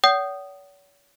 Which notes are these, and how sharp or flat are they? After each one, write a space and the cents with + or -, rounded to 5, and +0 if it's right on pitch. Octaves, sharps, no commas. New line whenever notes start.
C#5 +45 F#5 +45 D#6 -10